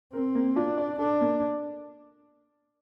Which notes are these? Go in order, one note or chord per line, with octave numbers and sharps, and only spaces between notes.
C4 A#4
A#3
D4 F4
D5
D4 A4
A#3